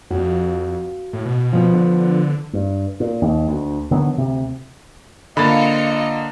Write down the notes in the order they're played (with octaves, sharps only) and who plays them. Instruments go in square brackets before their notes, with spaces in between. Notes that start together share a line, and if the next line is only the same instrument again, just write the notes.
[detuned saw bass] F2 [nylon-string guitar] F#4 F5
[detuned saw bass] A2
B2
[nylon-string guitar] F3 B3
[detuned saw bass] D3
[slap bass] G2
A#2
D#2
D2
D3 D#3 F#3 B3
D2 C3
[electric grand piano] D3 A#3 [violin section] C4 F4 C#7 [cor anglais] D#5 [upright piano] B5 A6